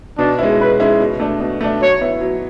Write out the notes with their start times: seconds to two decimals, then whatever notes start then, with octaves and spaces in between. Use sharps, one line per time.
0.19 B2 D4
0.39 G#3 C#4 E4
0.59 B2 B4
0.80 G#3 C#4 E4
1.00 B2
1.20 A3 D4
1.40 B2
1.61 A3 D4
1.81 F#3 C#5
2.01 B3 E4
2.21 F#3